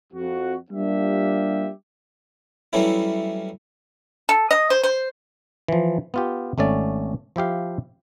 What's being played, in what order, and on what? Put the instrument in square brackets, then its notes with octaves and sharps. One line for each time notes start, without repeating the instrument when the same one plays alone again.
[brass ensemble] F2 F#4
G3 A#3 D4 F4 G4 E5
[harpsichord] E3 F#3 G3 A3 C#4 E4
[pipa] A4
D#5
C5
C5
[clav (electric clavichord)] E3 F3
B3 F4 G4
G#1 A3 C#4 D5
F3 E4 G4 F5